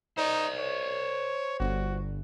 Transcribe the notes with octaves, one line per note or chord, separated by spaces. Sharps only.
D#4 C5 D5
C#5
G1 F#4